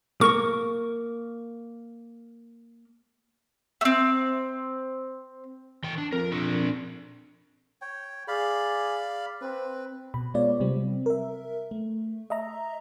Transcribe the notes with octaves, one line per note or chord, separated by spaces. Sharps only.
A#3 C#6
A3 C4
E3 G5
D4
F2 A#4
D4 A#4
C#5 G5
G#4 D5 F5 B5
C4 B4
B2 B5
G#3 B3 F4 C#5 D5
C3 F#3 G3 C4
A#4 E5
A3
D#5 E5 A#5